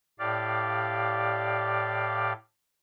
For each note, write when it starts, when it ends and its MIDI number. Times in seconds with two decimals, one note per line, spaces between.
0.19 2.33 45
0.19 2.33 67
0.19 2.33 74
0.19 2.33 77